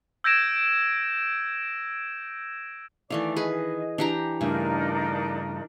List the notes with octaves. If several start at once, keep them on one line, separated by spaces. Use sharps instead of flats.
E6 G6 G#6 A#6 D7 E7
D#3 E3 A3 D5 F5 D6
G#4 B4 D#5
E3 D4 G4 A#5
G2 C#3 A3 D4 D#4 A#4